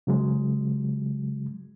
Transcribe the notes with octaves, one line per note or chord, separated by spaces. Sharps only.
C#3 F#3 G#3